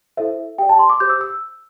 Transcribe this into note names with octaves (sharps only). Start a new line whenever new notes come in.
E4 A4 C5 E5
G4 D5 G5
A5
C6
D6
G4 C5 G6
E6
E6